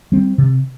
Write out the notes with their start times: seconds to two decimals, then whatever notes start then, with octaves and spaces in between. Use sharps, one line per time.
0.12 G3 C4
0.38 C3